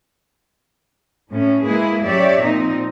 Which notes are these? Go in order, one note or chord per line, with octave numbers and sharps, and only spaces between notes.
A2 C#4
G#3 A#3 E4 G#4 B4
F#2 G4 C#5 D5 E5
A#2 F3 C4 D#4